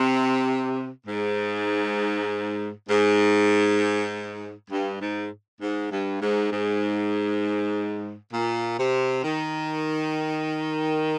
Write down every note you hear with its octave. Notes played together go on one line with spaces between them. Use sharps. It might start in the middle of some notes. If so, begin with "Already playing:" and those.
Already playing: C3
G#2
G#2
G2
G#2
G#2
G2
G#2
G#2
A#2
C3
D#3